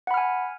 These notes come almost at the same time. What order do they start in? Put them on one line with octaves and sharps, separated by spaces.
F#5 B5 F6 G#5